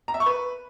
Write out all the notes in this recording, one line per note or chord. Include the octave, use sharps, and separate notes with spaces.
A#5
E5
C#6
B4